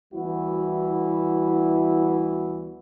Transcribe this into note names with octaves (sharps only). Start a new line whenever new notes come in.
D2 E3 G3 B3 E4 F#4